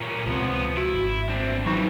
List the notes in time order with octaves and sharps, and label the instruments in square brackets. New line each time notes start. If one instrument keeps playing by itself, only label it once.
[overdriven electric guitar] A#2 C#4
[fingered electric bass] C#2 C3 [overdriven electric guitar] F3 B3
[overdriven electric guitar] E4 [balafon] F#4
[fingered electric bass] G#1
[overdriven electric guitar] C4 D4
[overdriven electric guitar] E3 G3 [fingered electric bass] F#3 [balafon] D#4 C#6